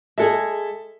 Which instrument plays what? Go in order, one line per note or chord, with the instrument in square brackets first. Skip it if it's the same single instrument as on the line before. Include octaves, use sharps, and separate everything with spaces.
[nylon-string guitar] G#3 G#4 [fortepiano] A4 E5